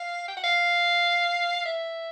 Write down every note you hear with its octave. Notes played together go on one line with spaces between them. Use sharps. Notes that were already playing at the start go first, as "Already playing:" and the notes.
Already playing: F5
G5
F#5
F5
E5